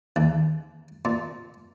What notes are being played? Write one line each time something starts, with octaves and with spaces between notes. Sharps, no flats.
D#2
A#2